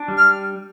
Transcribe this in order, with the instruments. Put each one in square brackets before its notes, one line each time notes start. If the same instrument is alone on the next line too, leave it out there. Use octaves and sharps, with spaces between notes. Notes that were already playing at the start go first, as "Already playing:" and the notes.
Already playing: [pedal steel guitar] D4
G3
[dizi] F6